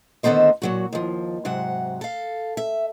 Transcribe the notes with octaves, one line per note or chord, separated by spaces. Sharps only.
D3 D#3 B3 A4 C5 D#5
A#2 F#3 F#4
D#2 F3
G#2 C3 F#3 F#5
A4 F5
E5